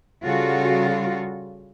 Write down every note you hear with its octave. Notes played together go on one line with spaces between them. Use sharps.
C#3 G3 F4 F#4 A4